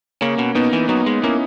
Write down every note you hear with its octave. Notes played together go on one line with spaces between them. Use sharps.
C#3 A#3 C#4
B2
B2 B3 D#4
E3
F#3 B3 D#4
G#3
A#3 C#4 E4